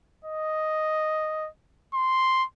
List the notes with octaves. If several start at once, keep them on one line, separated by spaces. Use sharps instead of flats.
D#5
C6